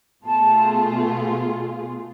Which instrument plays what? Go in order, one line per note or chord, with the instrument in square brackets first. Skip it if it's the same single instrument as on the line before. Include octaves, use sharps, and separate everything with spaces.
[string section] B2 A3 F4 G#4 [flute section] A5